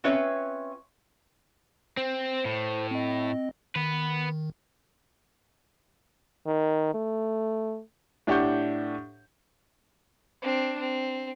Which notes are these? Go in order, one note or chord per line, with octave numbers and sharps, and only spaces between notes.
C4 C#4 F4 B4 C#5 E5
C4 C5
A2
C4 D#5
D#3 B3 B4
D#3
A3
A2 D4 G4 F#5 C#6 G6
C4 D4
C4